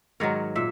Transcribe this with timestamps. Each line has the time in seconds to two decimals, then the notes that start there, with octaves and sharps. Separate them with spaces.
0.20 G#2 D#3 F#3 A#4 C#5
0.56 A#2 E5